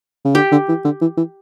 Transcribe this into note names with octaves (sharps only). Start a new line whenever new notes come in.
C#3
D3 G4
D3
E3
D3
E3
E3